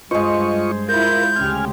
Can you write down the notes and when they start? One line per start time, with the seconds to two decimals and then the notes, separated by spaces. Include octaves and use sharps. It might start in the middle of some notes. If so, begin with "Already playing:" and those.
0.11 G2 G#3 F4 C5 D#5 C#6
0.89 E4 F4 A#4 G6
1.36 D2 C#3 G4 G#5 F6